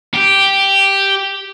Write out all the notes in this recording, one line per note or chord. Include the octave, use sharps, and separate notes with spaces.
G4